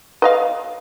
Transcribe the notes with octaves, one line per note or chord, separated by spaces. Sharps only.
B4 D#5 F5